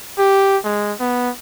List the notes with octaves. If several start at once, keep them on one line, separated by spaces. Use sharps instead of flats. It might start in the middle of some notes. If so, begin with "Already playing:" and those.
G4
G#3
B3